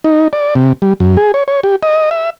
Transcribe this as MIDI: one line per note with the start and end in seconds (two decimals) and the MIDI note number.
0.04 0.28 63
0.33 0.54 74
0.55 0.73 48
0.82 0.93 55
1.00 1.17 42
1.17 1.32 68
1.34 1.43 73
1.48 1.60 73
1.63 1.76 67
1.83 2.10 75
2.11 2.30 76